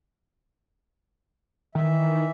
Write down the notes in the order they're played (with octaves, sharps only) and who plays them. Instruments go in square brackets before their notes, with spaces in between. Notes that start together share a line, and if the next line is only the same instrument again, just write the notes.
[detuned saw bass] D#3 [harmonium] E3 E5